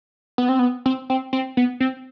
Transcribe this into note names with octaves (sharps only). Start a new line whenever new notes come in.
B3
C4
B3
C4
C4
C4
B3
C4